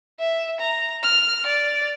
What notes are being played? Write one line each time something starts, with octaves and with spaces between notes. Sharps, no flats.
E5
A#5
F6
D5